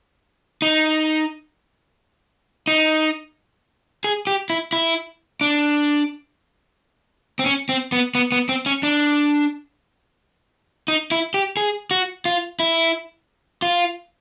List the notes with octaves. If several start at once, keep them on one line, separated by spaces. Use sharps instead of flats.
D#4
D#4
G#4
G4
E4
E4
D4
C4
C#4
C4
B3
B3
B3
C4
C#4
D4
D#4
E4
G4
G#4
F#4
F4
E4
F4